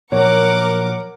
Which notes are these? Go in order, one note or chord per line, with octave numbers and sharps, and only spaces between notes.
A#2 F3 F#3 A#4 C#5 F#5 D6